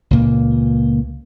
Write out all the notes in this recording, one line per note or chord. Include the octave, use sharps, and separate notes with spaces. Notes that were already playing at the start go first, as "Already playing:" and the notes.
C#2 A#2 A#3